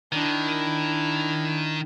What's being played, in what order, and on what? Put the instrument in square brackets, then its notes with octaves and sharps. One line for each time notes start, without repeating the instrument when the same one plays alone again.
[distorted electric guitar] D#3 [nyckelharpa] D4 E4